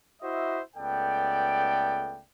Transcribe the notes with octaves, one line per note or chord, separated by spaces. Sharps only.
E4 F#4 C5 D#5 E5
C#2 A3 B3 A4 D5 G5